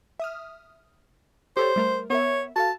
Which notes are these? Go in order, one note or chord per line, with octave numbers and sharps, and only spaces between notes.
E5 D#6 F6
G4 A4 C5 C#5
G3 A3 A#4
B3 A#4 C#5 E5
F#4 A4 F5 A5